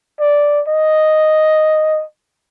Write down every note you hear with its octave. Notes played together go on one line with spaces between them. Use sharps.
D5
D#5